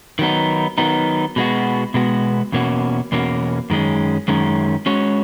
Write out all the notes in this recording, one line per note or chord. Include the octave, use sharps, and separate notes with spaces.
D#3 F#3 B3 D#4
D#3 F#3 B3 D#4
B2 G#3 B3 F#4
B2 G#3 B3 F#4
E2 B2 A#3 C#4 F#4
E2 B2 A#3 C#4 F#4
F#2 D#3 G#3 C#4
F#2 D#3 G#3 C#4
G#3 C#4 F#4 C#5